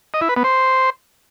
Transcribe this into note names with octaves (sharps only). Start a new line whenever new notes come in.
D#5
E4
B4
B3
C5